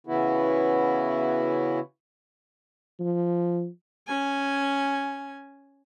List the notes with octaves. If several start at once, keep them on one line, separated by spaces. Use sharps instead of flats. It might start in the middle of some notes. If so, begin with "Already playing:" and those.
C#3 E3 B3 E4 F#4
F3
C#4 G#5